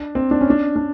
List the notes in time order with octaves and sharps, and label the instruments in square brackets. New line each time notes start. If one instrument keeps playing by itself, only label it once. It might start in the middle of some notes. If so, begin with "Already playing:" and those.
Already playing: [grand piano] D4
C4
D4
C#4
D4
D4